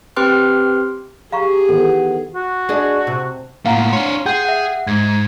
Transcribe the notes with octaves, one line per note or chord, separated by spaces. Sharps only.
C4 G4 B4 G5 C6 F6
G4 G#4 F5 A#5 C#6
D#3 E3 B3 A4
F#4
D4 G#4 D#5
C3
A2 A#3 F5 F#5 A#5
D4 C#5 C6
G#4 F#5 G5 G6
E5 F#5
G#2 G#6